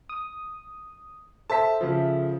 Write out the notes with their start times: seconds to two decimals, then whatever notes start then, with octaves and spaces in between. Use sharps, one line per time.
0.09 D#6
1.50 A4 C5 E5 A5 B6
1.81 C#3 F3